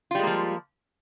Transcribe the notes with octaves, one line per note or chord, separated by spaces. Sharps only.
F3 G3 G#3 A#3 F4